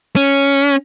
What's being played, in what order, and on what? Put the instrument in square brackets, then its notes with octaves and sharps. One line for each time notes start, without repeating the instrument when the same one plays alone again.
[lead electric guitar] C#4